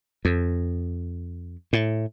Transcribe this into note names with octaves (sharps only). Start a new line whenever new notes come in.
F2
A2